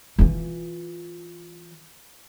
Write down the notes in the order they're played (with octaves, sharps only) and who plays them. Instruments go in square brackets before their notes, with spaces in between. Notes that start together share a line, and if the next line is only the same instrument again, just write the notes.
[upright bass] E3 F4